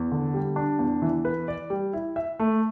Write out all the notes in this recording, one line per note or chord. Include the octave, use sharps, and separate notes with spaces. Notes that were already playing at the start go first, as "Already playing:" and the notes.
Already playing: E2
D3
G3
D4
E2
E3
B4
D5
G3
E4
E5
A3